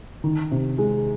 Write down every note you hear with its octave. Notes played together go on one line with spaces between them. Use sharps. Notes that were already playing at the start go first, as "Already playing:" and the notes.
D#3
C3
G#3